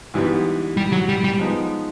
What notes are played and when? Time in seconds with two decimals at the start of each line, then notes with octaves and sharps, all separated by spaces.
0.14 G#2 E3 G3 B3
0.77 G3
0.92 F#3
1.09 G3
1.24 G3
1.39 F3 G#3 B3 D#4